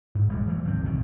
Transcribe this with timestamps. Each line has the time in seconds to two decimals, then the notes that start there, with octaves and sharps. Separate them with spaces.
0.15 G#2
0.29 E1 G3 G#3
0.47 E3 F#3 A#3
0.65 G#1 D2 C3 C4
0.84 B1 F2 D#3